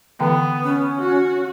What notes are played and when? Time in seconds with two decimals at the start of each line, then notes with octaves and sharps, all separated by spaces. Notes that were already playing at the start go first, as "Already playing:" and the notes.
0.20 D3 E3 B3 G5
0.64 C#4
0.99 F#4